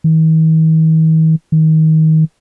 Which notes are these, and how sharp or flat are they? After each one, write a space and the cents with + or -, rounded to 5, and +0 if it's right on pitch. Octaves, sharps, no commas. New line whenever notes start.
D#3 +45
D#3 +25